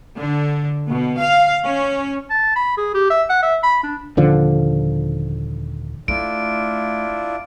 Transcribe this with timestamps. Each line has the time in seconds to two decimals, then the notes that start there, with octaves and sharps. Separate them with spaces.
0.18 D3
0.90 B2
1.21 F5
1.65 C#4
2.30 A5
2.56 B5
2.77 G#4
2.95 G4
3.10 E5
3.30 F#5
3.43 E5
3.64 B5
3.84 D4
4.17 D#1 D3 F3
6.08 A3 D4 E4 F4 D7